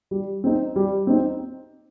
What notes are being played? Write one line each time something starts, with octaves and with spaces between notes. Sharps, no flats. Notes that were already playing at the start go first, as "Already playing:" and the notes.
G3
C4 D#4
G3
C4 D#4